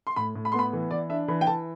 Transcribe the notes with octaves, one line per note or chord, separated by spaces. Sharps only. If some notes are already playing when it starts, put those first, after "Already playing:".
C6
A2 B5
A2
B5
B3 C6
B5
E3
E3 D5
D4 E5
E3 B5
G5
E3 A5